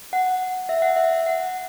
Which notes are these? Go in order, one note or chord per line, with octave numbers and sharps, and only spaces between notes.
F#5
E5
F#5
E5
F#5